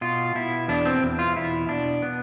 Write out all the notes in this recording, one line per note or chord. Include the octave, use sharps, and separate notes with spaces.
B2 F4
B2 E4
E2 D4
C4
E2
F4
B2 E4
B2 D4
B3